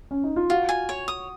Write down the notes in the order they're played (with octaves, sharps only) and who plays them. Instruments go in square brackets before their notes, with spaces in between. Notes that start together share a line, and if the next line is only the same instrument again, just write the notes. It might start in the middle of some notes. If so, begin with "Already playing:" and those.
[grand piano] C#4
D#4
F4
[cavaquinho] F4 [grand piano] F#4
[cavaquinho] G#5
C#5
D#6